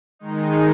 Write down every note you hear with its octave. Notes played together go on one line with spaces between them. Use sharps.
D#3 G#3 D#4